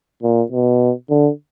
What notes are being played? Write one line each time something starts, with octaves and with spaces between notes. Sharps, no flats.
A#2
B2
D3